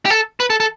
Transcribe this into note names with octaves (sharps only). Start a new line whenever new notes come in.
G4
A4
B4
A4
A4